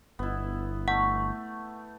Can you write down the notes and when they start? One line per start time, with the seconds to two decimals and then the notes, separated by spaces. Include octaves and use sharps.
0.19 G1 B3 E4
0.88 A3 F#5